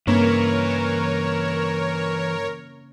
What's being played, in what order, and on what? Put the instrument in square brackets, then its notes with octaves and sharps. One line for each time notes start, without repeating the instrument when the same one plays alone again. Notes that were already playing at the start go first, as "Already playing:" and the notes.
[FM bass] G2 [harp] C#3 A#3 C4 [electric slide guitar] E3 B4 [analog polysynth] A#4 C#5